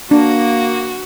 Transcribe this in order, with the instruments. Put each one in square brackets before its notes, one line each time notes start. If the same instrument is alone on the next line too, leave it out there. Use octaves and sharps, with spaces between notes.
[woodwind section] A#3 [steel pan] D4 [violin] F#4